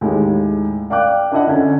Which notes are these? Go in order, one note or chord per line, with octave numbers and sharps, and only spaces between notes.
D#2 A2 G#3
D5 F5 G5 D6 F#6
D4 E4 D#5 F#5
D3 C#4